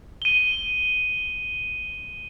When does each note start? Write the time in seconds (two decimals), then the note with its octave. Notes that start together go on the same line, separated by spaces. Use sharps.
0.22 D#7 G7